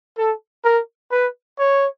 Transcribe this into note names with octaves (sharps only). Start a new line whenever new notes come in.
A4
A#4
B4
C#5